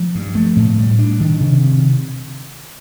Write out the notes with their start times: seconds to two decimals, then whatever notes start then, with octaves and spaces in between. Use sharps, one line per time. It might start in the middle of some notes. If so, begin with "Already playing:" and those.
Already playing: F3
0.15 G2
0.35 A3
0.56 A2
0.78 G3
0.99 D4
1.20 D#3
1.40 C3